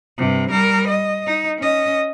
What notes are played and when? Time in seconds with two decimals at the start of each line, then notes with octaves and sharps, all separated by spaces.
0.18 G2 C3
0.51 G3 A#4
0.88 D#5
1.27 D#4
1.59 C#4 D#5